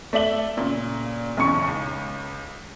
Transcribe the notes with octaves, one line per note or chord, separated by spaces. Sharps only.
A3 D5 E5 F#7 G7
A#2 C#3
B1 E2 C#3 D#4 C#6 C#7
C#2